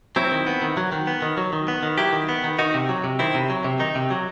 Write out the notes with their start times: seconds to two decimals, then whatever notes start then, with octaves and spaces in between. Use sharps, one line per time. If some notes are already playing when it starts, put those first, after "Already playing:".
0.16 F#3 C4 E4
0.31 D#3
0.47 B3
0.62 D#3
0.77 F#3
0.92 D#3
1.07 B3
1.22 D#3
1.37 F#3
1.53 D#3
1.68 B3
1.83 D#3
1.98 F#3 E4 G4
2.13 D#3
2.29 B3
2.44 D#3
2.59 D#3 D#4 F#4
2.74 C3
2.89 F#3
3.04 C3
3.19 D#3 C4 E4
3.34 C3
3.50 F#3
3.64 C3
3.80 D#3 D#4
3.95 C3
4.10 F#3